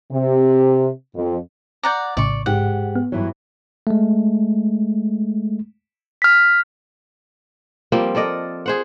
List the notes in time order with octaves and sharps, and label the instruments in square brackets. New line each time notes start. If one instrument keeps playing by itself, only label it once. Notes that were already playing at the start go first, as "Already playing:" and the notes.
[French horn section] C3
F2
[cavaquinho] D5 F#5 A#5 [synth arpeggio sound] D6 G6
[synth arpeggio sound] A#1 A2 C#3 [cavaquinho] D5 C#6
[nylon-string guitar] G#2 G4 [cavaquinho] F#5
[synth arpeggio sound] B3
[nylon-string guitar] G2 E3 F#3
[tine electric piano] G#3 A3
[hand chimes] F6 B6
[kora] F3 G3 A#3 C4
A4 A#4 D5 D#5
G#4 C5 F#5